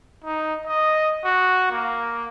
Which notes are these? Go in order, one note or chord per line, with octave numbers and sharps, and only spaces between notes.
D#4
D#5
F#4
A#3